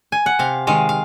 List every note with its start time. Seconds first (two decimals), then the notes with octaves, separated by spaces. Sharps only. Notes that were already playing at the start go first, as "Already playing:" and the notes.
0.12 G#5
0.26 F#5
0.39 C3 F5
0.67 D#3 G#3 F5
0.89 F5